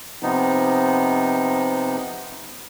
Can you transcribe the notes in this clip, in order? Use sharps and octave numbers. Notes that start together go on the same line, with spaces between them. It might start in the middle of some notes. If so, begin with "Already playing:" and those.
C3 F3 B3 D#4